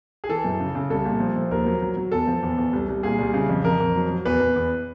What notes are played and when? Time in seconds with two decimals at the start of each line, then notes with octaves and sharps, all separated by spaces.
0.24 G#4
0.29 E3 A4
0.44 F#2
0.60 C#3
0.75 C#3
0.90 C2 A4
1.05 A#2
1.20 F3
1.36 F3
1.51 D#2 A#4
1.66 F#3
1.82 F#3
1.97 F#3
2.12 E2 A4
2.27 F3
2.43 E2
2.58 E2
2.73 C2
2.88 C2
3.03 A#2 G#4
3.19 C2
3.34 C#3
3.49 F2
3.64 F2 A#4
3.80 F2
3.95 F#3
4.10 F#3
4.25 E2 B4
4.40 E2
4.56 E2